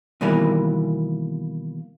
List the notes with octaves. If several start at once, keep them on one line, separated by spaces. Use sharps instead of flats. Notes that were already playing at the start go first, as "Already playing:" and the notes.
B2 D#3 E3 G3 A#3